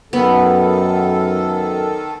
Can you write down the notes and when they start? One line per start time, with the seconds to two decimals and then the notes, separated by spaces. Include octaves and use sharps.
0.13 F#2 D#3 B3 A4